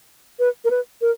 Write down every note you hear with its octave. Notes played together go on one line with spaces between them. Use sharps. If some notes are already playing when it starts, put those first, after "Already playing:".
B4
A#4
B4
A#4